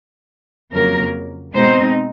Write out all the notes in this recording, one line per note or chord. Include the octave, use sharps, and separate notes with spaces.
F2 C#3 F#3 A#3 A#4
B2 G#3 C4 D#4 C5